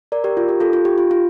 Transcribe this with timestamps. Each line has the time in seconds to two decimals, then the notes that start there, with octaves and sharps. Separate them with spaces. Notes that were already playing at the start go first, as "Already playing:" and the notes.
0.12 A#4 D5
0.24 G4 A#4
0.37 F4
0.49 G4
0.60 F4 A4
0.73 F4
0.85 G4
0.98 F4
1.11 F4